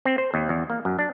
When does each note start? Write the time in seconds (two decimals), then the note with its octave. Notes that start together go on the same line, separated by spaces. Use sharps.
0.05 C4
0.18 C5
0.34 D#2
0.49 E2
0.70 A#3
0.85 F#2
0.99 D4